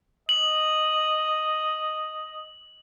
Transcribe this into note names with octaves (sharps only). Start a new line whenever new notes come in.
D#5 F#7